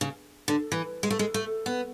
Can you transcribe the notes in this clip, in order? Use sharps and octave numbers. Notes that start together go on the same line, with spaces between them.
C#3
D3
E3
G#3
A3
G#3
A3
B3